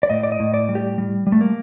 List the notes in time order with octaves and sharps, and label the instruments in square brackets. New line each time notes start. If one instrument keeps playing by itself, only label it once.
[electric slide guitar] D5
A2 D#5
D5
D#5
A2
D5
G3
G4
G3
G3
A3
A#3